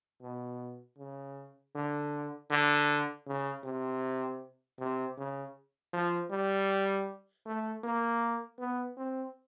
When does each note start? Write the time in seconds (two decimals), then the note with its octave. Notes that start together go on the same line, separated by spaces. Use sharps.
0.22 B2
0.98 C#3
1.75 D3
2.50 D3
3.27 C#3
3.64 C3
4.79 C3
5.17 C#3
5.93 F3
6.30 G3
7.46 A3
7.84 A#3
8.59 B3
8.97 C4